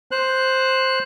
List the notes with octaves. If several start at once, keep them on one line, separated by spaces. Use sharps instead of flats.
C5 F#6